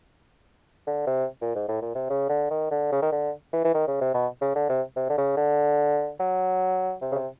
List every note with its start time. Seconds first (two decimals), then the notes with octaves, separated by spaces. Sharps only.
0.87 D3
1.06 C3
1.41 A#2
1.55 G#2
1.68 A2
1.82 A#2
1.95 C3
2.10 C#3
2.29 D3
2.50 D#3
2.71 D3
2.92 C#3
3.02 D#3
3.12 D3
3.53 E3
3.64 E3
3.74 D#3
3.87 C#3
4.01 C3
4.14 B2
4.41 C#3
4.55 D3
4.69 C3
4.96 C3
5.09 D3
5.17 C#3
5.37 D3
6.19 F#3
7.02 C3
7.12 C#3
7.15 C3